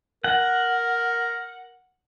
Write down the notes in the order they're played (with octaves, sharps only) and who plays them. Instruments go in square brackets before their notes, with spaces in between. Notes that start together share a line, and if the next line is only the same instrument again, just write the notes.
[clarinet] A#4 [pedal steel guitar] F#5